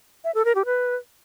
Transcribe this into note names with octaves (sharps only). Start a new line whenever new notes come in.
E5
A4
A#4
G4
B4